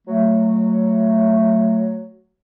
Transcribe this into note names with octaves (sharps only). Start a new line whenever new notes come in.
F#3 A3